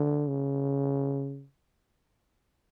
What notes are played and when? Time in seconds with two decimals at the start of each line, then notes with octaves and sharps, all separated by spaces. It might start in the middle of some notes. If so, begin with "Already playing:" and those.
Already playing: D3
0.28 C#3